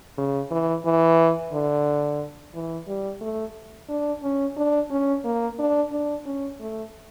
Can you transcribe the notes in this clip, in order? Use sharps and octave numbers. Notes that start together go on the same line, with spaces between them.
C#3
E3
E3
D3
E3
G3
A3
D4
C#4
D4
C#4
A#3
D4
D4
C#4
A3